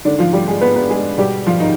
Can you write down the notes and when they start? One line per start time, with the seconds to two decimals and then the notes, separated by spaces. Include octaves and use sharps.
0.05 G#2 D3 D#3 D4
0.19 F3 F4
0.33 G3 G4
0.48 G#3 G#4
0.61 B3 B4
0.76 B3 B4
0.90 G#3 G#4
1.18 B2 G3 G4
1.47 F3 F4
1.60 D#3 D#4